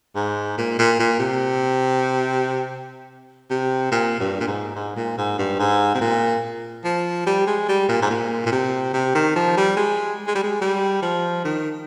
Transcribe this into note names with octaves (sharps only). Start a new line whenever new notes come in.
G#2
A#2
A#2
A#2
C3
C3
A#2
G2
A#2
G#2
G#2
A#2
G#2
G2
G#2
C3
A#2
F3
G3
G#3
G3
A#2
G#2
A#2
A#2
C3
C3
D#3
F3
G3
G#3
G#3
G3
G#3
G3
F3
D#3